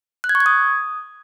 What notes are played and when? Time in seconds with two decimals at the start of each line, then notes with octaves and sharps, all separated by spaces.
0.24 F#6
0.29 G#6
0.35 C#6
0.40 G#6
0.46 D#6